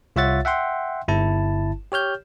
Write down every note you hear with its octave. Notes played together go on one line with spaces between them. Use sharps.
C2 F4 C#5 E5 F#5 A6
E5 F#5 G5 C6
G1 E4 A5
G4 C#5 F6 G6